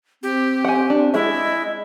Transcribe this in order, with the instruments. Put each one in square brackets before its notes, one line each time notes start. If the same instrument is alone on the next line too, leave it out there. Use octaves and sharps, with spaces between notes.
[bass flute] C4 [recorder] G4
[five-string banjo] F#5 G#5
D4
[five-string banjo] G#3 E5 [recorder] E4 [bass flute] D#5